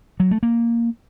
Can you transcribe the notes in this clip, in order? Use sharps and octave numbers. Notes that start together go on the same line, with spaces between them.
F#3
A3
A#3